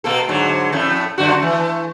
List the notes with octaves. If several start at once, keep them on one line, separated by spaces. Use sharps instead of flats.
B2 A#3 A4
G#2 D3 F#3
F2 A2 A3
F#2 D3 F#4
E3 A3